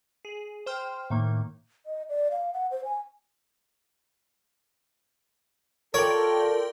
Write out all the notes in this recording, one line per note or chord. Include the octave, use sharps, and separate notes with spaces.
G#4
C5 G5 C6 F6
A2 D#3 A#3
D#5
D5
F5
F#5
C5
G#5
F4 A4 A#4 C#5 D5 G5